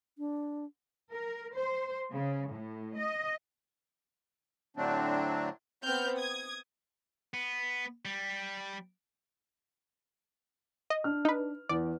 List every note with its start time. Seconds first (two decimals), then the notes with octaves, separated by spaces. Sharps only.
0.18 D4
1.11 A#4
1.55 C5
2.11 C#3
2.51 A2
2.96 D#5
4.77 A2 D3 F#3 A3 C4 D4
5.83 B3 C4 F6 G6
6.18 D#6 G#6
7.34 B3
8.05 G3
10.90 D#5
11.04 D4 F6
11.25 D#4 B4
11.69 E2 D5